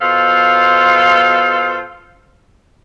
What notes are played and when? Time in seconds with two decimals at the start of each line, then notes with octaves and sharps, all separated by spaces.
0.02 B2 F4 A4 C5 F5